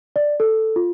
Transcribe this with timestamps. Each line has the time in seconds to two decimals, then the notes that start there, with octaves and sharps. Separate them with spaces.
0.16 D5
0.40 A4
0.76 F4